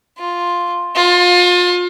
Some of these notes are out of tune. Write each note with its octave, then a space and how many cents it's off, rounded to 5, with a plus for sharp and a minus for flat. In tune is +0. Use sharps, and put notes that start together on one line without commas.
F4 +5
F4 +30